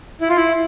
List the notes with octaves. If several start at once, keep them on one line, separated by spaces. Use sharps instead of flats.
E4
F4
E4